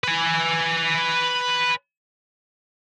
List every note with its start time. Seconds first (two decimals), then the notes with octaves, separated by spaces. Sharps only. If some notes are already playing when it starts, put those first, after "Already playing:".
0.04 B4 G#5